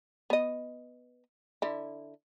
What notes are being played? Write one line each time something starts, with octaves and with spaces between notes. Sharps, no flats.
B3 D#5
D3 E4